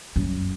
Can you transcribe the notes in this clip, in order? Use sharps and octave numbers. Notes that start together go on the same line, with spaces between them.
F#2